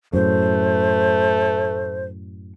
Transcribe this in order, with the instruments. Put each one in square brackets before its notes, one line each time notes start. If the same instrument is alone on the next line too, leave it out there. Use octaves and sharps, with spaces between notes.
[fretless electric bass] F#2 A2 [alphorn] A3 [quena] C5